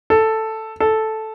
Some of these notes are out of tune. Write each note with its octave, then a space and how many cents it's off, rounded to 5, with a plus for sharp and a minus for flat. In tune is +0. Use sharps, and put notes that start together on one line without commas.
A4 +5
A4 -5